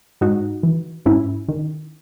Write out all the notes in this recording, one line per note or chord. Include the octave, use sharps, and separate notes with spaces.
G#2 D#4 F#4
E3
G#2 C#4 E4
D#3